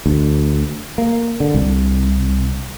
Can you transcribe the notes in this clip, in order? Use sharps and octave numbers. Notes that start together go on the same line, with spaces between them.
D2
A#3
D3
C2